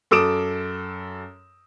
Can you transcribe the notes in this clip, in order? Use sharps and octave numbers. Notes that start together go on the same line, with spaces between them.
F#2 A4 D6 D#6 D7 E7